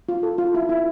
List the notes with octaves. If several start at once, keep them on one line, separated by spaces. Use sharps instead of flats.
F4
A4
F4
E4
E4